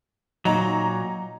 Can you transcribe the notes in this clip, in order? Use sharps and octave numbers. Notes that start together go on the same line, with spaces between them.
A#2 F#3 D#4 A#5